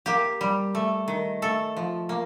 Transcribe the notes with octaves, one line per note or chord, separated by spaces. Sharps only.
A#3 G4
G3
A3
D#3
A3 A4
F3
A#3